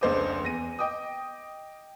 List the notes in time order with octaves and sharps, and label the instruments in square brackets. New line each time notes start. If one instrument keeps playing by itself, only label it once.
[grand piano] F1 C#2 D4 C5 D#5 D6
E2 A#6 D#7
D#5 G5 D6 D#6